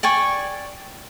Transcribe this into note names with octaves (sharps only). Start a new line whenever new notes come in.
D5 G5 G#5 C#6